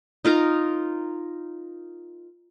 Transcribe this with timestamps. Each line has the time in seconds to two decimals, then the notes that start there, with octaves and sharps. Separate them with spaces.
0.25 D#4 F4 A#4 A#5